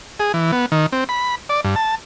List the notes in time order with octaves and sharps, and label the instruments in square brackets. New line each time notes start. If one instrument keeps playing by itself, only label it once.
[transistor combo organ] G#4
E3
B3
D#3
C4
B5
D5
G2
A5